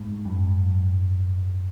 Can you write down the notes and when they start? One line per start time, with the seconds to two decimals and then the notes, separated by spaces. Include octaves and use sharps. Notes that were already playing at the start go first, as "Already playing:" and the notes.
Already playing: G#2
0.25 F#2